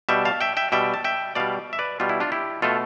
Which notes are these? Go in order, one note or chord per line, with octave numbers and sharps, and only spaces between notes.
B2 G3 E5 G5
F5 A5
E5 G5
E5 G5
B2 G3 E5 G5
A5
E5 G5
B2 G3 D5 F5
E5
B4 D5
B2 G3 F4
E4
D4 F4
E4 G4
B2 A3 F4 A4